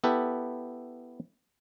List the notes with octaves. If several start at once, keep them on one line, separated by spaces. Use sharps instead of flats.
B3 E4 G4 A4 B4